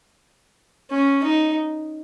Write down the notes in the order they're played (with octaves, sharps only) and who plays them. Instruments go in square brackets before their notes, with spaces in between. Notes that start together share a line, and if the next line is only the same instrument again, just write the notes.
[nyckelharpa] C#4
D#4